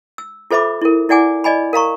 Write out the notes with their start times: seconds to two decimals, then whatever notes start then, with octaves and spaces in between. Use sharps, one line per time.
0.18 E6
0.51 F4 A4 C5 E5 B5 D6
0.82 E4 A#4
1.09 E4 D5 F#5 G#5 D6
1.44 D5 D#5 G#5 B5
1.73 A#4 F5 A#5 C#6